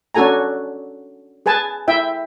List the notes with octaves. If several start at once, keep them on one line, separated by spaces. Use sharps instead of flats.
C#4 D4 F#4 A4 G#5 A#5
G#4 B4 G#5 A5
E4 E5 G5